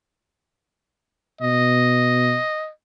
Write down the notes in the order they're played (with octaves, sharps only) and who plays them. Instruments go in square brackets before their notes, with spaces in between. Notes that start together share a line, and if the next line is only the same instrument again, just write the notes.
[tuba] B2 [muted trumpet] D#5